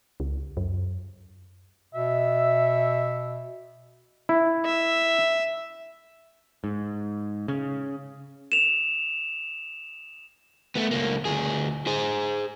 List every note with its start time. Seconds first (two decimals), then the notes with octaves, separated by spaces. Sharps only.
0.20 C#2
0.57 F#2
1.94 B2 E5
4.29 E4
4.66 E5
6.64 G#2
7.48 C#3
8.52 E7 F7
10.75 A3 B3
10.91 C#2 A#3
11.25 D2 G#4
11.87 G#4 C5